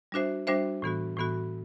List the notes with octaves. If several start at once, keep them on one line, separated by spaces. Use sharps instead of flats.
G3 D4 F#4 C5 E5
G3 D4 F#4 C5 E5
A2 E3 B3 F#4
A2 E3 B3 F#4